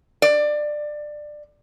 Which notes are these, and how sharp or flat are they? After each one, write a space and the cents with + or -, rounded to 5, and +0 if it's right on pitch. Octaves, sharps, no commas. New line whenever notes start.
D5 +20